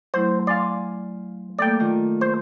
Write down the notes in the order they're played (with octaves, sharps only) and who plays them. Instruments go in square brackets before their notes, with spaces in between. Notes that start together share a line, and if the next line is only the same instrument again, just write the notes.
[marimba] F#3 A3 E4 [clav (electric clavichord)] C5
[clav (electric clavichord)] D5 [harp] F5 G#5 C6
[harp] A3 A#3 [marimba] A4 [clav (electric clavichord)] D5 G5
[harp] D#3 [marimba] A3 F4
[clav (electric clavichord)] C5